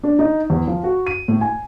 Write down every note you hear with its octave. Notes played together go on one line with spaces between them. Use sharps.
D4
D#4
E2
F3
F#4
D#7
A2
G#5